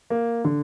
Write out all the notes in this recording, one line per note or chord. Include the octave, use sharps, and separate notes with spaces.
A#3
D3